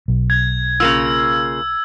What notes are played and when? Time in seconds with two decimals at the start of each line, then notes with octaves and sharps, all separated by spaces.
0.08 B1
0.30 G#6
0.80 C#3 A#3 F4 E6